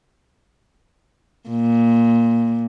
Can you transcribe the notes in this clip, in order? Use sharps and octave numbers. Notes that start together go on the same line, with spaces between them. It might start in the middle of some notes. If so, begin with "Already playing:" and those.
A#2